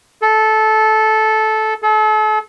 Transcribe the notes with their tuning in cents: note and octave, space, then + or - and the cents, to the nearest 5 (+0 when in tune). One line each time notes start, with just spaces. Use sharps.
A4 -15
A4 -40